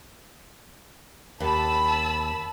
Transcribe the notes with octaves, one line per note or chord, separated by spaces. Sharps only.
D#2 A5 B5 E6